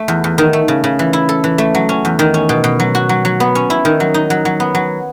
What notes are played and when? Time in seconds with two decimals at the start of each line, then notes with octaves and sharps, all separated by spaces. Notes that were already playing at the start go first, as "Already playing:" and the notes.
Already playing: A3
0.08 E2
0.24 E2
0.38 D#3
0.53 A3
0.68 C#3
0.84 C#3
0.99 E3
1.13 E4
1.29 A4
1.44 E3
1.58 A3
1.75 F#3
1.89 C#4
2.05 E2
2.19 D#3
2.34 C#4
2.49 B2
2.64 B2
2.80 F#3
2.95 F#4
3.09 F#3
3.25 F#3
3.40 B3
3.55 C#4
3.70 E4
3.85 D#3
4.00 F#3
4.14 D#4
4.30 F#3
4.45 F#3
4.60 B3
4.75 F#3